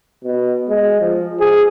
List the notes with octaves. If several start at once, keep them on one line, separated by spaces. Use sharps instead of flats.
B2
G#3
F3
G#4